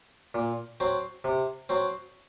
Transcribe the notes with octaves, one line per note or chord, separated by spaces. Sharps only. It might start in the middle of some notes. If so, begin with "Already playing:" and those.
A#2
F#3 C4
C3
F#3 C4